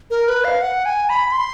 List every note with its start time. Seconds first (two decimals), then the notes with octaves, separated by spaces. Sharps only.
0.11 A#4
0.28 B4
0.44 F5
0.62 F#5
0.85 G#5
1.09 B5
1.32 C6